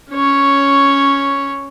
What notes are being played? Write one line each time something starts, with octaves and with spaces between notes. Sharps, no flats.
C#4 C#5